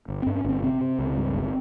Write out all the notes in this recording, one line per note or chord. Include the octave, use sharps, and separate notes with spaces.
G1
G2 C4
C#4
G1 C4
C3 C4
C3
C#2
G2
G1